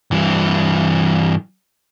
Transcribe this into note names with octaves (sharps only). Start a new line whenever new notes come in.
G2 E3